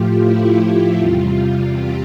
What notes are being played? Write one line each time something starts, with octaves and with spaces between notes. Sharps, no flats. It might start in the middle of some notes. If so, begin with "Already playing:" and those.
Already playing: A2 F3 A3 F4 G4
E4
F4
E2 C3 G3
G4